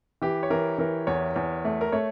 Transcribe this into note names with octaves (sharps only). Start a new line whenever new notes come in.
E3 G4
C#5
E3 A#4
E3 A#4
E2 C#5
E2
A3
A#4
A3 C#5